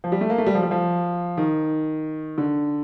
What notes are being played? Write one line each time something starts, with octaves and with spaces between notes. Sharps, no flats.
F3
G3
A3
A#3
A3
G3
F3
G3
F3
D#3
D3